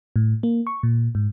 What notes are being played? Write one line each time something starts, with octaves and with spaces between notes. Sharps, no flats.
A2
A#3
C#6
A#2
G#2